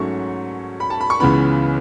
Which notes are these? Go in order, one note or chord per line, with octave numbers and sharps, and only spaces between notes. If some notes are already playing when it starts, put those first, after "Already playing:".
Already playing: G#2 F#3 A3 C#4 C#6
B5
A5
B5
C#6
C#2 C#3 E3 B3 B5